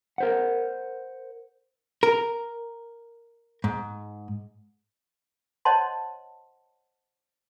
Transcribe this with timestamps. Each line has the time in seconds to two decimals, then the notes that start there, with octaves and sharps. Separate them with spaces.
0.18 A#4 C5 F#5
2.03 A#4
3.64 G#2
5.65 C5 C#5 D#5 F#5 A5 C6